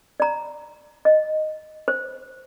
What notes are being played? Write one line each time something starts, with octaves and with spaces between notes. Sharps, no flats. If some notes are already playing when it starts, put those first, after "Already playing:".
D5 A#5
D#5
C5